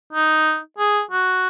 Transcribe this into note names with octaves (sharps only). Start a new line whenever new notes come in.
D#4
G#4
F#4